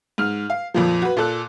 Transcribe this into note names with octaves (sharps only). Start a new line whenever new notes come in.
G#2 F6
F5
F2 A#2 F3
F#4 B4
A#2 A4 F#6